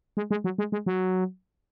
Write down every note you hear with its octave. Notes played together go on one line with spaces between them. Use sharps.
G#3
G#3
F#3
G#3
G#3
F#3